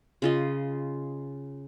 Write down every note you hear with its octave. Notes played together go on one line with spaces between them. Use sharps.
C#3 F4 D#5